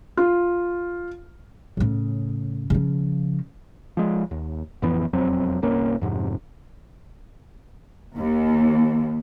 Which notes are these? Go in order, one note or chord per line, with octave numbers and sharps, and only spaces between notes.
F4
A2 C#3
C#3 F3
F3 G#3
D#2
A1 F2 E3 B3
E1 F2 F#3 C4
G1 C2 A#3 C#4
F2 G#2 C3
D#2